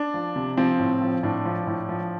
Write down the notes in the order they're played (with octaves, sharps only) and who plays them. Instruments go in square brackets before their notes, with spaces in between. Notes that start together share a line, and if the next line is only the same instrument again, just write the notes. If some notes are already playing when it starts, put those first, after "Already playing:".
Already playing: [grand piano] D4
F3
C3
F3 C4
A2
F3
A2 D4
F3
A2
F3